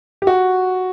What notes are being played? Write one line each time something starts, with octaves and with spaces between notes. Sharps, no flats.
G4
F#4